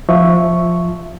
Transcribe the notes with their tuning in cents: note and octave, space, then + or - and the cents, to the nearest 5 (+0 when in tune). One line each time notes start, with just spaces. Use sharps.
F3 +0 E5 +0 C#6 +0